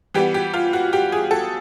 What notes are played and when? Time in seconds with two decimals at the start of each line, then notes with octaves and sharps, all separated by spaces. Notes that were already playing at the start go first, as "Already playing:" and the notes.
0.14 E3 G3 B3 G4
0.34 G4
0.54 F4
0.73 F#4
0.93 G4
1.12 G#4
1.31 A4